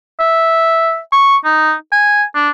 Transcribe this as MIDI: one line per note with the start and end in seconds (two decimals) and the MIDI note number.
0.20 0.99 76
1.12 1.37 85
1.45 1.73 63
1.92 2.23 80
2.35 2.50 62